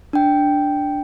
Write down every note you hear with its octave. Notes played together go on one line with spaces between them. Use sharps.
D4 G5